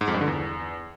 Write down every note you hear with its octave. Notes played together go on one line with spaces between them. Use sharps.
G#2
F2
G2
D3
E2